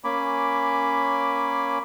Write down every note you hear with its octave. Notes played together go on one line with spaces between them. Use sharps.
A#3 C#4 G#5 B5 D6